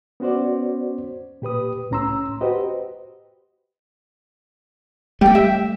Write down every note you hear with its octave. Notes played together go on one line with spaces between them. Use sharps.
B3 C#4 F#4 C5 D5
A#2 G4 B4 D#6
C2 A2 C#4 A#5 C6 E6
F#4 G4 B4 C5 D#5
G3 A3 G4 G5
E5